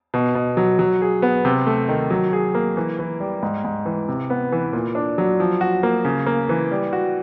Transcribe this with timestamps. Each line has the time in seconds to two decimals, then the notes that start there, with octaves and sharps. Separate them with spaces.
0.14 B2
0.35 B2
0.57 F#3
0.79 F#3
1.02 G#4
1.22 B3
1.45 C3
1.67 A3
1.89 D#3
2.10 F#3
2.33 G#4
2.55 A#3
2.77 E3
2.99 E3
3.20 G3
3.43 G#2
3.65 G#2
3.86 E3
4.08 C3
4.30 B3
4.52 E3
4.73 A#2
4.95 D4
5.18 F#3
5.40 F3
5.61 F#4
5.83 A#3
6.05 C#3
6.26 A#3
6.49 E3
6.71 G3
6.93 F#4